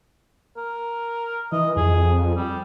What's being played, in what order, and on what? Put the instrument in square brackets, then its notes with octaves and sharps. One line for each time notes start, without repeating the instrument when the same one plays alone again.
[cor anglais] A#4
[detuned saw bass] E3 [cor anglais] D#5
[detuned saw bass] F2 [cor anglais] G#4
[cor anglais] G3